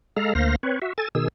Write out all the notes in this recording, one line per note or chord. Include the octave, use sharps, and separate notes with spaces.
G#3 A4 F5 A#5
D2 A#3 C5 F5 A#6
C4 B4 C#5
F#4 E5
A4 G#5 A6
B2 D#3 G#4 E6